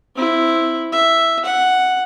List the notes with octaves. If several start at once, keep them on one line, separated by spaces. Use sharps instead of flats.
C4 E4
E5
F#5